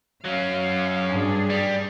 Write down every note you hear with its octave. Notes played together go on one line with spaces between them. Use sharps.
F#3 C#4 F5
G2 D4 G#4
G3